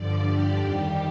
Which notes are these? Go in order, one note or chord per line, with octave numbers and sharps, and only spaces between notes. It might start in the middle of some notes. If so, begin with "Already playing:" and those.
Already playing: G2 D3 F3 D5
G4
F2 D#3 G3